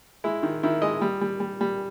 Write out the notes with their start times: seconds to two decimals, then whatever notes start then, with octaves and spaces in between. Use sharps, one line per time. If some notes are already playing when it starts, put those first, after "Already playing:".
0.24 G#3 E4
0.43 D#3
0.63 D#3 E4
0.82 G#3 D#5
1.01 G3
1.21 G3
1.40 G3
1.61 G3